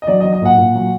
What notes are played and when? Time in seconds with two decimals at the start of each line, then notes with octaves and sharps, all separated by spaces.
0.02 D#5
0.07 F#3 D5
0.20 D#5
0.24 F#3
0.33 D#5
0.42 A#2 F#5
0.58 A#2
0.75 F#3